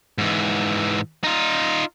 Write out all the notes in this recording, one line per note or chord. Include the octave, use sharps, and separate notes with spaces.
G#2 E3
D#4 F4